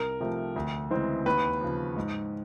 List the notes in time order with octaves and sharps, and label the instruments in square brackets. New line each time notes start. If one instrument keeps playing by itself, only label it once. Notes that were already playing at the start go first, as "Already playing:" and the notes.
Already playing: [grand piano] C2 A#4
C3 F3 A3
D2
C#3 E3 G#3 C4
D#2 B4
C#3 F3
G#2